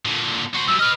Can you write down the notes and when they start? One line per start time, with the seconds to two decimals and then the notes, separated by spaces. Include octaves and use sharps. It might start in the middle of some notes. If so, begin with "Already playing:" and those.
0.05 A#2 D3
0.54 F#4 C5
0.67 F#2 G3 E6
0.79 B4 D#5 F6